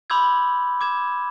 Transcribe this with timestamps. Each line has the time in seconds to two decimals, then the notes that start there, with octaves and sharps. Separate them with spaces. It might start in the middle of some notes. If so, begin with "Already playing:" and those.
0.10 B5 C6 D6 E6 G6 G#6
0.81 D6 G#6 E7